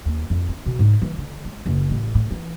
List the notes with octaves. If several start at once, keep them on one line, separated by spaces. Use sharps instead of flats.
D#2
F2
C4
B2
G#2
E3
D3
G#3
F#1
A1
A2
E3